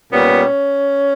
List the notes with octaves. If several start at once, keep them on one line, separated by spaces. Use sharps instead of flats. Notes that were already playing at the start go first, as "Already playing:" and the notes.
A#2 G3 B3 C#4